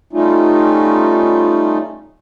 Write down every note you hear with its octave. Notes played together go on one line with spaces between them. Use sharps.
G3 A3 C#4 D#4 F4